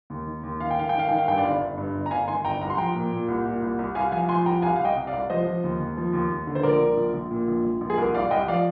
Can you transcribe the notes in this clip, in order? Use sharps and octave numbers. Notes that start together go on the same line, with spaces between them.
D#2
D#3
D#2
D#3 F5
G5
D#3 F5
G5
D#3
F5
D#3 G5
F5
G2 G5
D5 F5
G1
G1
G2
G1
A#5
G1 F5 G#5
D#3 G#5 C6
G1 G5 A#5
C2 A#5
C6
F3 G5 A#5
A#2
A#2
C2
A#2
C2
C2
C2 F5 G#5
F3 F5 G#5
F3 G#5 C6
C2 G5 A#5
C2 F5 G#5
C2 F5
D#5 G5
C3
D5 F5
C2
F3 C5 D#5
F3
D#2
D#2
F3
D#2
D#2
D3
C5
A#1 A#4 D5
A#1
A#1
A#1
A#2
A#1
A#1
A#1
G#4
C2 A#4
C2 D5 F5
C2 D#5 G5
F3 D5 F5